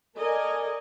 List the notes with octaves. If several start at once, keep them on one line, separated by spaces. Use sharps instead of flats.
A4 A#4 D5 D#5 G#5